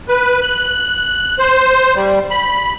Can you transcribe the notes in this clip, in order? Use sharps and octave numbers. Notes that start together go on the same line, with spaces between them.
B4
F#6
C5
G3
B5